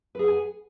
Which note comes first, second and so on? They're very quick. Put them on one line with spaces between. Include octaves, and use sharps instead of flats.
B4 G#4 F#5 G#5